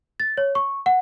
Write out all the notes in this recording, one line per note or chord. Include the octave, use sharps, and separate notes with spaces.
A6
C#5
C#6
F#5